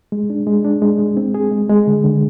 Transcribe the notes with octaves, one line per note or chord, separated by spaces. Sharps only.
G#3
D4
G#3
D4
G#3
G#3
C4
G#4
G#3
G#3
D3
D3